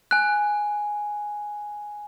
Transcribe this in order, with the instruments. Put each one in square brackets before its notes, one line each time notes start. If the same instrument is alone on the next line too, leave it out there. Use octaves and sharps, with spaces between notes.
[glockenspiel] G#5 F#6